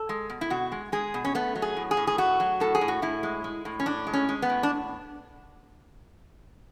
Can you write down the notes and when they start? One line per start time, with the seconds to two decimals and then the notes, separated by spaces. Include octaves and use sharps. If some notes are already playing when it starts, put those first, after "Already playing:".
Already playing: A4
0.09 G#3
0.30 B2
0.41 E4
0.50 B2 F#4
0.72 G#3
0.92 G#3 G#4
1.14 B2
1.25 C#4
1.35 A3 B3
1.55 F#3
1.62 G#4
1.76 A2
1.91 G#4
1.97 A2
2.07 G#4
2.18 A3 F#4
2.40 F#3
2.60 A2 A4
2.75 G#4
2.81 A2
2.88 F#4
3.02 A2 E4
3.23 G#3
3.44 G#3
3.65 A2
3.80 C#4
3.86 A2 D4
4.07 G#3
4.13 C#4
4.29 G#3
4.42 B3
4.49 A2
4.63 D4